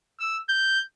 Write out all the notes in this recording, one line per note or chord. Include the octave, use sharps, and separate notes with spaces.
E6
G6